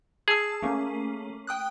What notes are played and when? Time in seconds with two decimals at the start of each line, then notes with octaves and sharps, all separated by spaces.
0.28 G#4 A5 E6
0.62 A3 A#3 C#4
1.47 G5 D#6 F#6